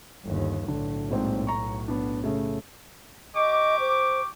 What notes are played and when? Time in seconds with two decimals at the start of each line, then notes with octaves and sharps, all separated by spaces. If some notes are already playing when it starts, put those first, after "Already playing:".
0.26 G1 D#2
0.68 B1 A2 D3
1.11 A#1 G#2 C4
1.47 A#5 C#6
1.88 B3 D4
2.24 C#3 A3
3.35 G4 D#5 C#6 D6
3.80 C5